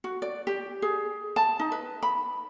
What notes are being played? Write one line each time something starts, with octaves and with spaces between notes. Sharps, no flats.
F#4
D5
G4
G#4
A5
D#4
B4
B5